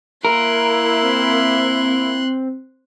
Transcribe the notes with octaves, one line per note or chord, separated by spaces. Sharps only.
A#3 E4 A#4 C6 F#6
C4